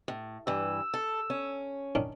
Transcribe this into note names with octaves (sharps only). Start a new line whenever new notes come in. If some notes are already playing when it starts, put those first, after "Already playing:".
A2
G2 E3 E6
A4
C#4
D#3 C#4 D4